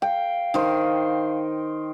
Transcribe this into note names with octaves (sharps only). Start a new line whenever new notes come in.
F5 G5
D#3 C5